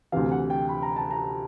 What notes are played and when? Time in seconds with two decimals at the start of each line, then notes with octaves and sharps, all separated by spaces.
0.12 D2 C3 E3 F5
0.32 F#5
0.50 G5
0.69 B5
0.83 A#5
0.96 A5
1.11 A#5